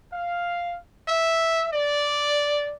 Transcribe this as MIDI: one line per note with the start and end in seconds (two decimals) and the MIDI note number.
0.13 0.77 77
1.08 1.67 76
1.72 2.73 74